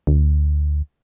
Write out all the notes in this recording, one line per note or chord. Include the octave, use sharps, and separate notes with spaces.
D2